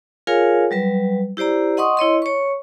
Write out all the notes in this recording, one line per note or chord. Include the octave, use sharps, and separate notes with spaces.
F4 G#4 A#4 C#5 F5 G#5
F#3 G3 B4
E4 G4 C5 D5 A#5
D#5 F#5 C6 C#6 D#6
E4 C#5 D#5 C6
C#5 C#6